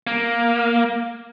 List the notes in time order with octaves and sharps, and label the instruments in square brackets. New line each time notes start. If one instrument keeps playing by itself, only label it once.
[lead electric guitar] A#3